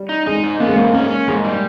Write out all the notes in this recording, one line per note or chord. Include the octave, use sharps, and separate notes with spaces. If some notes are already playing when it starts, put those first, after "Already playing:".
Already playing: G3
D#4
G#3 D#4
G#2
A#3 B3
G#3
G#2 A#3
A#3 C#4
C#4
G#2 G#3
G3